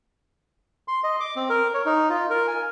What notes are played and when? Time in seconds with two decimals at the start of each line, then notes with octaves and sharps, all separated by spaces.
0.88 C6
1.04 D#5
1.20 D6
1.36 C4
1.49 A#4
1.74 C#5
1.86 D#4
2.10 F4
2.30 A#4
2.47 G#5